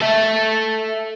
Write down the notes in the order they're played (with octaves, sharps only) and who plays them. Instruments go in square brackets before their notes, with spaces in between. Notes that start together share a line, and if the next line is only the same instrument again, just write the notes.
[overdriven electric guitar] A4 E5